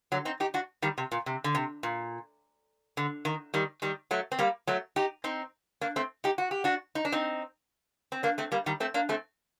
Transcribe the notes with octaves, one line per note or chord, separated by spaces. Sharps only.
D3 F#3
C4 D#4
D#4 G4
D4 F#4
D#3 G3
C3
A#2
C3
D3
C3
A#2
D3
D#3
D#3 G3
D#3 G3
F#3 A3
C4
G3 A#3
F#3 A3
D#4 G4
C4 D#4
A#3 D4
A3 C4
D#4 G4
F#4
G4
D4 F#4
D#4
D4
C4 D#4
C4
A#3 D4
A3 C4
G3 A#3
D#3 G3
A3 C4
A#3 D4
A3 C4